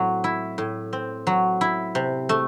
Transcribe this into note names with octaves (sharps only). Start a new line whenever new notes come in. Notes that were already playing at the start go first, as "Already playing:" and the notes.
Already playing: A2 F#3 C4
E4
A2
C4
F#3
E4
C3
A3